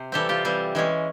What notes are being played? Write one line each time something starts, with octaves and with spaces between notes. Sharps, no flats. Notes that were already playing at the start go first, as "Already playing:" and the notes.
Already playing: C3 C5
E3 G3 C4 G4 A4
F4 G4
E3 G3 C4
E3 G#3 C#4